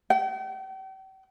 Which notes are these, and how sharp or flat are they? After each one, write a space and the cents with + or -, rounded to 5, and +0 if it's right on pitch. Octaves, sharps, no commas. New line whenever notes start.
G5 -40